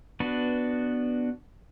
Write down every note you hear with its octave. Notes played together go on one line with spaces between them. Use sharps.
B3 D4 F#4 B4